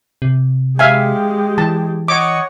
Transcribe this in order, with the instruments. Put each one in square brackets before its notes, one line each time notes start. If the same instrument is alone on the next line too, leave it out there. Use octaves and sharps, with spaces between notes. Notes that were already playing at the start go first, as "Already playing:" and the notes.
[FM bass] C3
[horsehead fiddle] G#3 G4 [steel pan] E5 F5 G#5
[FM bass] E3 [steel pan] A5
[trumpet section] C#5 D#5 F#5 [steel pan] D6